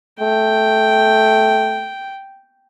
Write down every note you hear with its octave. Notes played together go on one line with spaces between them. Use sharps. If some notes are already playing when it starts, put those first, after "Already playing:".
A3 G5